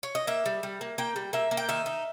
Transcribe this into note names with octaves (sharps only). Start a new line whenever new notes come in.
C#5
D#5
A#3 E5
G3
G3
A#3
A#3 G5
G3
A#3 E5
A#3
G5
D#3 E5
D#4